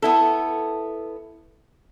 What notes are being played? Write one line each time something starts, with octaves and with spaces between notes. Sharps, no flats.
B3 E4 A4